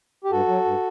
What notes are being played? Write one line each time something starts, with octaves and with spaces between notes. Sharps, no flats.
G4
G2 F#4 A4
F#3
G2